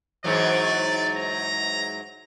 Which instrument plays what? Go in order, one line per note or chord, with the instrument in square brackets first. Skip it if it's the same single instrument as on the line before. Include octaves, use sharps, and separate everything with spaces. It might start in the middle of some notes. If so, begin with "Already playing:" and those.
[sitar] G#2 E3 F#3 [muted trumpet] D5
[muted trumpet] A#5